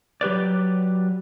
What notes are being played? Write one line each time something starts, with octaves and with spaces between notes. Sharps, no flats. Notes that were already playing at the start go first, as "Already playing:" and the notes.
F#3 G4 B4 D5